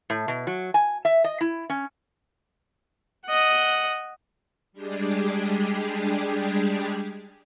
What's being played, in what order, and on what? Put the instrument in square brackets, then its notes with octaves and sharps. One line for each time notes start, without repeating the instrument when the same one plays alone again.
[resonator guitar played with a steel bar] A2
B2
F#3
G#5
E5
D#5
E4
C#4
[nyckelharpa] D#5 F#5
[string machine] G3 G#3 D4 G4 G#4